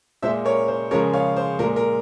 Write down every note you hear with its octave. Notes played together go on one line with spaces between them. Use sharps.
A#2 G#3 C5 E5
A#4 C#5
C5
C#3 F3 G#3 A#4 C#5
C#5 F5
C5
A#2 G#3 A#4
A#4